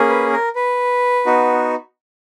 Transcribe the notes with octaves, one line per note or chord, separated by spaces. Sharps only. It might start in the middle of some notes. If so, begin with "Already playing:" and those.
Already playing: A#3 C#4 G#4
B4
A#4
B4
B3 D#4 F#4